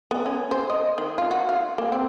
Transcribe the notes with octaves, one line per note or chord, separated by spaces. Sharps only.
B3
C#4
C5
D#5
D#3
F4
F#4
F5
A#3
C4